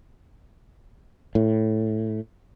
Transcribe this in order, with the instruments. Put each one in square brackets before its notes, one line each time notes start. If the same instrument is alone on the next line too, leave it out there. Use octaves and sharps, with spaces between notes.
[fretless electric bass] A2